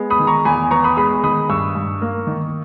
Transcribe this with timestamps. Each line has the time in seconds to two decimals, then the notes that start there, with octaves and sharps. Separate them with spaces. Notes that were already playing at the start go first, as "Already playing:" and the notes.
Already playing: G#3 B3
0.10 B5 D#6
0.19 D#3
0.27 A#5 C#6
0.45 E2 G#5 B5
0.71 B3 A#5 C#6
0.84 B5 D#6
0.97 G#3 B5 D#6
1.24 D#3 B5 D#6
1.49 G2 C#6 E6
1.75 G2
2.02 A#3
2.27 D#3